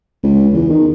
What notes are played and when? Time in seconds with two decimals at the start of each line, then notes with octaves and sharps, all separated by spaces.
0.23 C#2
0.53 E2
0.70 D#3